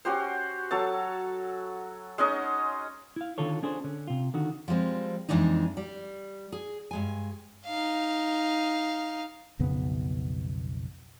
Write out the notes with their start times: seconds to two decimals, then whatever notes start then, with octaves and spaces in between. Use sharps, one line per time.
0.05 C#4 F#4 G4 C5
0.71 F#3 A4 C#5 A5
2.18 G#3 C#4 D#4 D#5
3.16 E4 F5
3.38 D3 D#3 F4 A4 C#5
3.63 C#4 D4 G#4 A4 C5
3.84 D3 C#4
4.07 C3 F4
4.34 D3 D#3 F#4
4.68 F3 G3 G#3 C4
5.29 F2 A#2 E3 G#3 D4 D#4
5.77 G3
6.52 G#4
6.91 G2 G#3 G#5
7.66 D#4 F5
9.59 B1 F2 C#3 B3